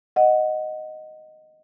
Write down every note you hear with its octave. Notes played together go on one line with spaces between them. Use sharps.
D#5 F#5